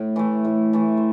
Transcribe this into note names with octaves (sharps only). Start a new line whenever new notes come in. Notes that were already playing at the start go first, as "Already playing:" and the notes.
Already playing: A2
E3 A3
A2
E3 A3
C5